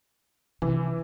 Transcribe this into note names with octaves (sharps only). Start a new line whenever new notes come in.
C3 E3